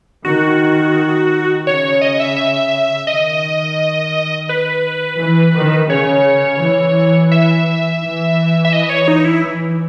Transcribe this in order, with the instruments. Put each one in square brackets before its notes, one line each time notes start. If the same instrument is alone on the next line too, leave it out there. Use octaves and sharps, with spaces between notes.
[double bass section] D#3 [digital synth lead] F#4
[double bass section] C#3 [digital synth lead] C#5
[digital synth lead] C#5
D#5
E5
E5
[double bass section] D#3 [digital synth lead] D#5
[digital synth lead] B4
[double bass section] E3
D#3
[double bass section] C#3 [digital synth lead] C#5
[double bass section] E3
[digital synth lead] E5
[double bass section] E3
[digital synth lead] E5
D#5
C#5
D#4
E4
[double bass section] E3